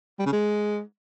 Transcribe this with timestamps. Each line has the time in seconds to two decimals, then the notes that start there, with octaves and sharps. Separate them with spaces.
0.19 G3
0.26 C#3
0.33 G#3